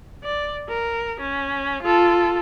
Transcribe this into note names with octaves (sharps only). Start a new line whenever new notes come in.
D5
A#4
C#4
F4 A4